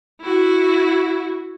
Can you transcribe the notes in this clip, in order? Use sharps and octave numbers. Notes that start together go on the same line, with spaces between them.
E4 F#4